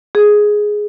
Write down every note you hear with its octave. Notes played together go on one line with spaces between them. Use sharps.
G#4